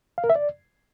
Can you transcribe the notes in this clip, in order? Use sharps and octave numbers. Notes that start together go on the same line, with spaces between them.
F5
A#4
E5
D5